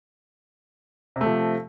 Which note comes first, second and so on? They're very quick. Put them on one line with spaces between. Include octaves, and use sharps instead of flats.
C3 A3 F3